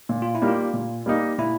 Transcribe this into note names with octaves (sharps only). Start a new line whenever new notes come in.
A#2
F4
E4
G3 A#3 D#4
F4
A#2
G3 A#3 D#4
A#2 E4